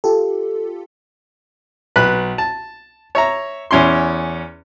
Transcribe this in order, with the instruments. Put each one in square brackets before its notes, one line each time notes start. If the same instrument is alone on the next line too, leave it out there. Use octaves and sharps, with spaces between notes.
[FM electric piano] F4 G4 A4
[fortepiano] B1 B4 B5 F#6
A5
C#5 E5 A#5
E2 C#4 E4 C6